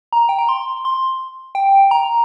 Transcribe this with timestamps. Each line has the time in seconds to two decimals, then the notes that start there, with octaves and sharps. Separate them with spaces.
0.13 A#5
0.29 G5
0.39 A#5
0.49 C6
0.85 C6
1.55 G5
1.91 A#5